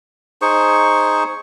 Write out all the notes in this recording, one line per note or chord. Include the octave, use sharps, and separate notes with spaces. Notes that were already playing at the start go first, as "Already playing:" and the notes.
D#4 G#4 C5 C#6